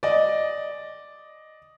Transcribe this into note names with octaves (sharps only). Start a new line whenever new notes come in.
D5 D#5